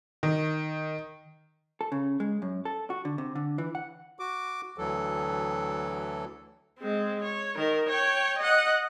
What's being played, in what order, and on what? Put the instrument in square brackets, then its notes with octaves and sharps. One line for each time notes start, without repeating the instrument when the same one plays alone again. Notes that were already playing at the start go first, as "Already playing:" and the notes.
[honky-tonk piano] D#3
[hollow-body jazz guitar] A4
C#3
G#3
F#2
A4
F#4
D3
C3
D3
E3
F#5
[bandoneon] F#4 D6
D2 E3 F#3 A4
[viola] G#3 C4
C#5
D#3 A#4
C#5 G5
D#5 F#5